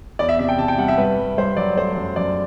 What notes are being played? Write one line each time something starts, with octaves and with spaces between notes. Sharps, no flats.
E2 D5
E5
C3 E5
G5
C3 A5
G5
G3 F#5
E5
G2 B4
G2
G2 C5
F#3 D5
A3 C5
F#2
F#2 D5